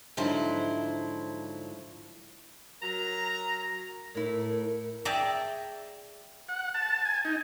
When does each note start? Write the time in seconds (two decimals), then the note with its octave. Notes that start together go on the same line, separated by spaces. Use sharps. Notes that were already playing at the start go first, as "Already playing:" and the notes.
0.17 G#2 D3 F3 F#3 E4 C5
2.82 F#3 A#4 A#5
4.15 A2 E4 A#4
5.05 G#4 D5 E5 G5 A5 A#5
6.49 F#5
6.74 A5
7.05 G#5
7.25 D#4